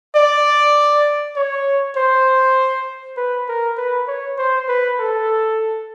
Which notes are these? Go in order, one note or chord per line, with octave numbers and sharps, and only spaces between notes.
D5
C#5
C5
B4
A#4
B4
C#5
C5
B4
A4